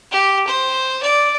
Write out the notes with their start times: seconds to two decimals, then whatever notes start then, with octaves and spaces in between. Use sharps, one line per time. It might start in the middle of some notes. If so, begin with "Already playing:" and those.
0.12 G4
0.47 C5
1.02 D5